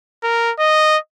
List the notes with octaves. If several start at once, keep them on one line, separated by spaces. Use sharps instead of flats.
A#4
D#5